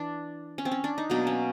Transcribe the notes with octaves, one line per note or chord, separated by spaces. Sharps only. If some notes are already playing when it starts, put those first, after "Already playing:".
Already playing: E3 D4
C#4
C4
C#4
D4
D#4
B2 F#3 A#3 D4
C#4